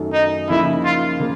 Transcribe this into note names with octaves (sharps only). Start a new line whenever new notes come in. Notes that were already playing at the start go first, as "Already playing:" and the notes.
Already playing: F#2 D#3 F#3 A3
D#4
C#3 F3 A#3 D#4 E4
F4
C#3 F3 A#3